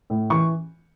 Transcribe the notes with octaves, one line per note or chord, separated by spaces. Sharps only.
A2
E3 C#6